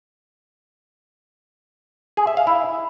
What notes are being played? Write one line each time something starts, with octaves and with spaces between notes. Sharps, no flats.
G#4
E5
F5
E4